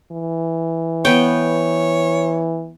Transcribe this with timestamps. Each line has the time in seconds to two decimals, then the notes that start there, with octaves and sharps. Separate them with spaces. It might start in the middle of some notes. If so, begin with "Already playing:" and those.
0.12 E3
1.05 B3 C#5 G5